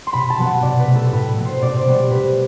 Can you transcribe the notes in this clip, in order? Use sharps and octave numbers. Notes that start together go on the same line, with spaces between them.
C6
B2 B5
A5
F#3 B3
F#5
B2 D5
B4
A3
A4
A2 B4
F#3 B3
C5
B2 D5
C5
G3 B3
D5
B2 B4